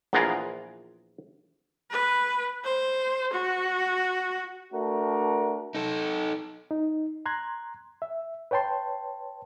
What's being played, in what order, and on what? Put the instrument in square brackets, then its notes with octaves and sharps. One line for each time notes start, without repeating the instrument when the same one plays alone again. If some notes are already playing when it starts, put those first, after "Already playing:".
[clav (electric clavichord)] A#1 E2 B3 F4 G#4 A#4
[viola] B4
C5
F#4
[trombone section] A3 D4 F#4 A#4
[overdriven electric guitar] D#4 A4
[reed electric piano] D#4
A#5 C6 F#6 G#6
E5
B4 C#5 G5 A5 C6